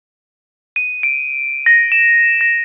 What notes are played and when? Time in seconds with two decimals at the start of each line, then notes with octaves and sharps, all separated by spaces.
0.76 D#7
1.03 D7
1.66 A#6
1.92 E7
2.41 A#6